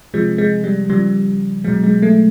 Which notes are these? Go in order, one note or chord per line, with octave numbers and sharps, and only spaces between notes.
C3 F3 G#3
G#3
G3
C#3 F3 G3
B2 F#3 G#3
G#3
A3